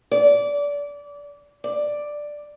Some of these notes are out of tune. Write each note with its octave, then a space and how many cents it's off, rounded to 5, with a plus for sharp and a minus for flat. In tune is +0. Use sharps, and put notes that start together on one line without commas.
D5 -25
D5 +5